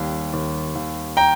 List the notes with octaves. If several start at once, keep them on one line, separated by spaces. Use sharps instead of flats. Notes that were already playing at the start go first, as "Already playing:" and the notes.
Already playing: D#2 G3
D#2
D#2
G5 A#5